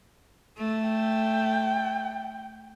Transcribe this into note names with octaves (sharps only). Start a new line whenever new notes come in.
A3
G5